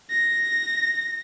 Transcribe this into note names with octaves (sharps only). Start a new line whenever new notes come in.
A#6